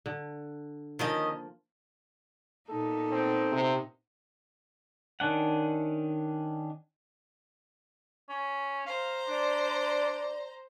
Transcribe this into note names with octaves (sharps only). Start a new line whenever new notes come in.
D3
D#3 F3 A#3 C#4 D#5
A#2 B3 D#4 A4
C4
C3
D#3 C#4 D4 F#5
C#4
C5 F5 A#5
D4 D5